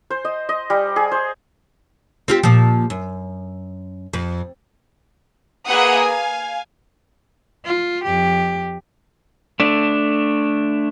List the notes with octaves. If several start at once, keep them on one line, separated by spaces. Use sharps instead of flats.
C5
D#5
D#5
G3
G#4
C5
C4 F4 G4
A#2 F3
F#2
F2
A#3 G#4 B4 E5 F#5 D#6
F5 G#5
F4
F2 G4
A3 D4